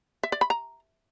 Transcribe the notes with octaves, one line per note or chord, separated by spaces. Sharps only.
E5
D5
B5
A#5